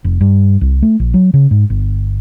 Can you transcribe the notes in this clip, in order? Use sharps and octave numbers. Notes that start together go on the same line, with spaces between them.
F1
G2
C2
A3
A#1
F#3
C#3
G#2
G1